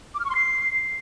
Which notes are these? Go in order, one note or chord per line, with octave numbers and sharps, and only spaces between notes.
D6
F6
C#6
C6
C7